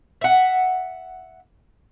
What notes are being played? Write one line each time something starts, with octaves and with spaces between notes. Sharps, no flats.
E5 F#5